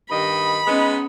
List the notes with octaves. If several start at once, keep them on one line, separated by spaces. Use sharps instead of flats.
G2 D#3 D#5 B5
G#3 B3 C#4 D#4 D#6